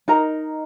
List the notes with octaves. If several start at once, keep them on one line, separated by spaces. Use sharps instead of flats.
D#4 A#4 D#5 A#5